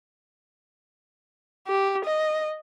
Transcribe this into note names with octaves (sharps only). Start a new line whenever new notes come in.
G4
D#5